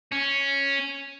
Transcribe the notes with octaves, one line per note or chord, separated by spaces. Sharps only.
C#4